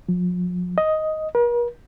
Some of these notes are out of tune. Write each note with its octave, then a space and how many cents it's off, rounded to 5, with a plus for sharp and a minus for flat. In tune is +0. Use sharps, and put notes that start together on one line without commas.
F3 +40
D#5 +5
A#4 +45